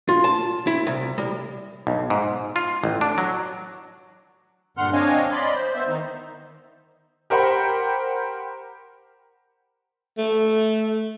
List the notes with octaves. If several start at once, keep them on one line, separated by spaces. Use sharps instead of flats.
F4
A5
E4
C2
G3
B1
G#2
F4
A1
D4
F#3
G2 A#2 D3 F#5 C6 F6
C4 D4 C#5 D#5 F5 G#5
D5 D#5 B5 C6
C5
B3 C5 E5
D#3 D#4
G4 A#4 C5 F#5 G5 B5
A3